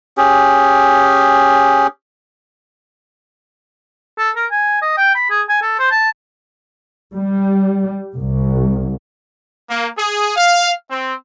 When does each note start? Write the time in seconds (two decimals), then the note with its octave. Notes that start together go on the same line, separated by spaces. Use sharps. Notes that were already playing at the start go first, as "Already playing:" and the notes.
0.18 C#4 G4 G#4
4.18 A4
4.36 A#4
4.51 G#5
4.82 D#5
4.97 G5
5.15 B5
5.30 G#4
5.49 G#5
5.62 A4
5.79 C5
5.91 A5
7.13 G3
8.14 C2
9.68 A#3
9.97 G#4
10.35 F5
10.90 C4